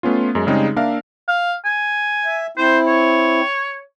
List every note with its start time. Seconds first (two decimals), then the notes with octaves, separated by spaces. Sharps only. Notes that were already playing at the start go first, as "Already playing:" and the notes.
0.03 A3 B3 C#4 F4
0.35 F#2 G#3
0.47 C#3 G3 G#3 C4 D#4 G#4
0.76 A#3 D4 A#4 E5 F5
1.28 F5
1.65 G#5
2.26 E5
2.57 C4 E4 C5
2.88 C#5